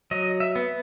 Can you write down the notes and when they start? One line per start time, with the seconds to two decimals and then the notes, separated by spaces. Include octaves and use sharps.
0.11 F#3 D#5
0.40 E5
0.55 B3